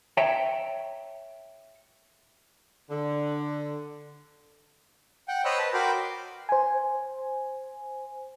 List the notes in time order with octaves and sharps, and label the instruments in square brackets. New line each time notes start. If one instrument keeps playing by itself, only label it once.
[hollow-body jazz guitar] C#5 E5 G5 A#5
[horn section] D3
[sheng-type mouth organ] F#5 G5
C5 C#5 D#5 B5 E6 F#6
B4 A5
F#4 A#4 G5 B5 C6 D6
[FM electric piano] C5 G#5